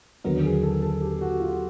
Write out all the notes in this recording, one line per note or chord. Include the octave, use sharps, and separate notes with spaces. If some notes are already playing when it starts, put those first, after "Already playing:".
D#2 D3 F#3 B3 A#4
G#4
A4
A4
G4
F#4
F4